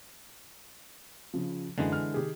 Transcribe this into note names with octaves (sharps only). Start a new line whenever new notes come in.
C#3 F3
F#2 D3 E3 G#3
F6
D#3 G4 G#4